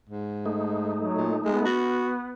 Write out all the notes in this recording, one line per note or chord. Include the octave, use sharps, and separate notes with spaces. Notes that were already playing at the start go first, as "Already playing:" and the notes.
G#2
A3 D#4
F#3
A#2
G#3 B3
F#4